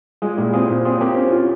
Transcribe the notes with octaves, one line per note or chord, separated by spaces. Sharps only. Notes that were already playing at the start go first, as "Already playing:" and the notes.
G#3 F4 G#4
A#2 E4 G4
C4 F4 G#4
A#2
C4 F4 G#4
C4 G4 A#4
C#4
F4